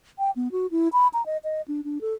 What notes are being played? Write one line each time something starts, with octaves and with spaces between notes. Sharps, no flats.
G5
B3
F#4
E4
B5
A#5
D#5
D#5
D4
D4
A4